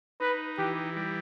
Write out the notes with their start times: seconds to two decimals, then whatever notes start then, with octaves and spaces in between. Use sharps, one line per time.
0.20 D#4 B4
0.58 E3 G4
0.97 G3